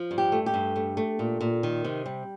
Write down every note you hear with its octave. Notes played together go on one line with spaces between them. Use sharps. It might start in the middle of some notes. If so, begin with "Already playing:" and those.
Already playing: F3
G2
G4
A3
G4
G2
A3
A3
A#2
A#2
D#3
C3
G3